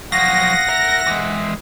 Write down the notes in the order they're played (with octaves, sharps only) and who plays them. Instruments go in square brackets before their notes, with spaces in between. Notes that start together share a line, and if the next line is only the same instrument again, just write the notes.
[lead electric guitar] F3 F#3 [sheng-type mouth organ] F5 D#6 [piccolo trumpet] F#5 [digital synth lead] A#6
[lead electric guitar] A#4 A#5 [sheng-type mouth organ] E5
[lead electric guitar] E3 G#3